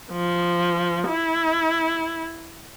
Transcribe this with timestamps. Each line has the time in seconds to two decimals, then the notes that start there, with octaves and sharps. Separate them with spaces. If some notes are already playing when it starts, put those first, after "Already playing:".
0.13 F3
1.08 E4